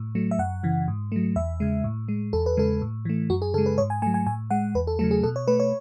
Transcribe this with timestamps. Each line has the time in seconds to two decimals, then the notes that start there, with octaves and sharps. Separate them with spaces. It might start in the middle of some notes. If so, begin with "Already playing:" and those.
Already playing: A2
0.15 F#3 A3
0.31 E5
0.39 F#2 F#5
0.63 C#3 E3
0.88 G#2
1.12 F#3 A3
1.36 E2 E5
1.60 C#3 G#3
1.84 A2
2.08 G#3
2.33 E2 A4
2.46 B4
2.57 C#3 G#3 A4
2.82 A2
3.05 E3 A3
3.30 F#2 F#4
3.42 G#4
3.54 C#3 A4
3.58 G#3
3.66 B4
3.78 G#2 C#5
3.90 G#5
4.02 A3 G#5
4.06 F#3
4.14 G#5
4.27 A2 G#5
4.50 G#3 F#5
4.75 E2 B4
4.87 A4
4.99 C#3 F#3 A3 A4
5.11 G#4
5.23 B2 A4
5.36 C#5
5.47 A3 B4
5.60 C#5